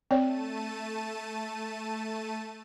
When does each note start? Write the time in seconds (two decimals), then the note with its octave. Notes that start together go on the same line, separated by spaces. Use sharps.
0.11 A3 C4 C#5 D5 A5 D#7